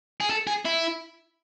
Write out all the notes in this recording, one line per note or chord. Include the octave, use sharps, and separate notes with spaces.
G#4
A4
G#4
E4